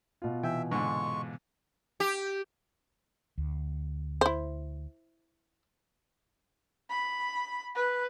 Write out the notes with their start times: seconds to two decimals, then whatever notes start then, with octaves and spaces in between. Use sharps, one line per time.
0.22 B2 F4
0.43 C3 E3 E5 G5 G#5
0.72 G#2 D3 G#3 C#6
2.00 G4
3.38 D2
4.21 E4 C5
6.90 B5
7.75 B4